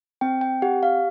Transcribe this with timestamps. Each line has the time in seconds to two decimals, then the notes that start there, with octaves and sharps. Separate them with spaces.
0.21 C4 G5
0.41 G5
0.62 G4 F#5
0.83 F5